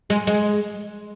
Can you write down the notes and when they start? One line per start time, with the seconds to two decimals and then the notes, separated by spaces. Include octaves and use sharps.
0.10 G#3
0.27 G#3